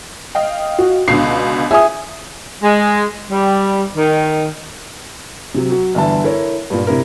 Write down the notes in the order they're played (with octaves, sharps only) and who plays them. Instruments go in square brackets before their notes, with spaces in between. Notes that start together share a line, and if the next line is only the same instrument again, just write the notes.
[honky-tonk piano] D#5 F5 G5
[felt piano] F#4
[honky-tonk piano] C#2 B2 D3 [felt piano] C7
[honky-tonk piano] G#4 [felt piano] E5 G#5 D#6
[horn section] G#3
G3
D#3
[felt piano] C3 F#3
F#3 F#4
G1 D3 E3 E5 A5
E4 A4 A#4 C#5
G2 A#2
C3 E4 A#4